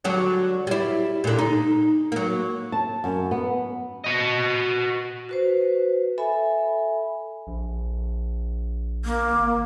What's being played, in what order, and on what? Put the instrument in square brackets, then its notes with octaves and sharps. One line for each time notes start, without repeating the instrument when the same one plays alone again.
[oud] D3 F#3 G3
G3 E4
A#2 D3
D#4
F#3 A#3
[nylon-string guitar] A5
F#2
B3
[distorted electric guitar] F#4 D#5
[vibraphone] F#4 B4 C5
A4 E5 G#5 B5
[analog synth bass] A#1
[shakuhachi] A#3
[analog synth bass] G#1